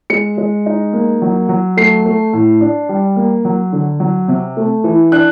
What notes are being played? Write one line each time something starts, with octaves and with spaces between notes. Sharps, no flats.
G#3 C#7
G#3
D#4
A#3
F#3
F#3
A3 C7
A3
A2
D4
G3
A#3
F#3
D3
F#3
C3
A3
E3
D4 F#6